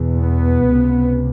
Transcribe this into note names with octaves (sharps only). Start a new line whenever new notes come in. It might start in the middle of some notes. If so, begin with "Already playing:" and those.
Already playing: E2 B2
B3
C#2 C3